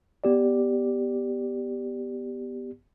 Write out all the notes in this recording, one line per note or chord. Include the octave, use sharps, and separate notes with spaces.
B3 G4 D5